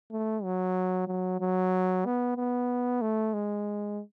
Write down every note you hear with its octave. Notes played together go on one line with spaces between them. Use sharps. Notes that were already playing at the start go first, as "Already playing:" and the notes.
A3
F#3
F#3
F#3
B3
B3
A3
G#3